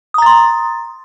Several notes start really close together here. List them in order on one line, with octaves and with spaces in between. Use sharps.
D#6 A#5 A6 C6